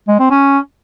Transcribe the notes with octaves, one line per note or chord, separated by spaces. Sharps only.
G#3
C4
C#4